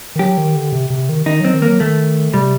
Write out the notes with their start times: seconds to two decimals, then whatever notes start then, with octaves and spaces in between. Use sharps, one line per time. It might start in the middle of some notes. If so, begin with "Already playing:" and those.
0.16 D#3
0.19 F#3 G4
0.38 D#3
0.56 D3
0.73 C3
0.90 C3
1.09 D#3
1.26 D#3 D#4
1.40 F#3 C4
1.54 D#3
1.62 A#3
1.67 F#3
1.80 D#3 A3
2.34 C3 G3